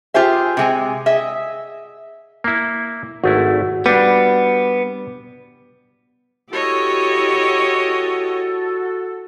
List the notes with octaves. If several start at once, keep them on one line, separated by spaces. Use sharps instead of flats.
F4 G4 G#4 C5 E5
C3 G#3 G#5
G#4 D#5 E5
A#3 E4
G#1 A3 E4 F#4
G3 B3 D4
E4 F#4 G4 A4 C#5 D#5